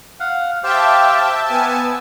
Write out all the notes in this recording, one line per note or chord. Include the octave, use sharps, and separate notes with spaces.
F5 F#5
G4 C5 E5 F5 G5 A5
B3 G#5 A5 E6